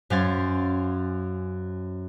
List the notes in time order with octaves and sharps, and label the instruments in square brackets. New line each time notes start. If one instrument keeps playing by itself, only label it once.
[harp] F#2 C#4 C5 F5 G#6 A6